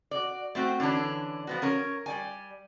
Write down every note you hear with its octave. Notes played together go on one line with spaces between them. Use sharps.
F#4 D5
A3 C4 F#4
D3 E3 C#4 D4
F3 B3 F#4
C#4 A#4 C#5
G3 D5 G#5